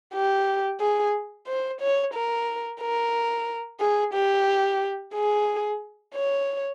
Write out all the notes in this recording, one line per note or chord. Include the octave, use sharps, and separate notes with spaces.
G4
G#4
C5
C#5
A#4
A#4
G#4
G4
G#4
C#5